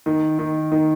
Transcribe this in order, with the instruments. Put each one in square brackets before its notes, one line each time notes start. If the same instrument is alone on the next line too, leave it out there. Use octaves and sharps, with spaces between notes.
[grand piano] D#3
D#3
D#3